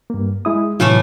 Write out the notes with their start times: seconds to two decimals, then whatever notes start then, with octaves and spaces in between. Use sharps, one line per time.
0.10 G2 A#3
0.45 G#3 E4 D#6
0.80 A2 C3 E3 F#3 A3 F4